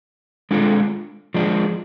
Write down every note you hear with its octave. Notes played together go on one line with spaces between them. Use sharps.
G#3 D4 F4 A4
F3 G#3 D4